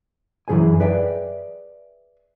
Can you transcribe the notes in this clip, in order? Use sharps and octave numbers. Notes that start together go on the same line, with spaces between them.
F#2 E3 F3 G#4 C5 G#5
G#4 B4 D5 E5 G5